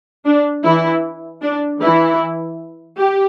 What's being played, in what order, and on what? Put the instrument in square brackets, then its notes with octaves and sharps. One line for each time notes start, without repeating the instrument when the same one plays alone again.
[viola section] D4
E3 E4
D4
E3 E4
G4